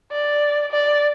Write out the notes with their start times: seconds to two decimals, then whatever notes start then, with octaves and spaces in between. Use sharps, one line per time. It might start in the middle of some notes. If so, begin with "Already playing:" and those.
0.11 D5
0.72 D5